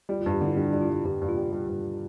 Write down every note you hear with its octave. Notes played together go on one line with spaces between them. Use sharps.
G3 F4
G2 F4
G4
D3 E4
G3 D4
G3
F4
G3
G2 G4
G2
F4
G3
G3
G2